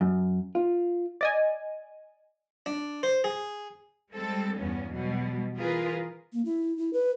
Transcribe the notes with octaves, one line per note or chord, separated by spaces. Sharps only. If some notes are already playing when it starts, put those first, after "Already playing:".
F#2
F4
D5 D#5 G#5
D4
C5
G#4
G3 G#3 C4 A4
E2 G2 B3 C#4
B2 F#3 G3
E3 F4 G#4 A#4 B4
A#3
E4
E4
B4